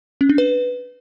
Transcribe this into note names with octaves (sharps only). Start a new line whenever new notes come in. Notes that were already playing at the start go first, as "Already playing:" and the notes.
C#4
D4
B4